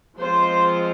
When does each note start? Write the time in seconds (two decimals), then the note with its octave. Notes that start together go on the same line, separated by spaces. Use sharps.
0.18 F3 G#3 C4 F4 C5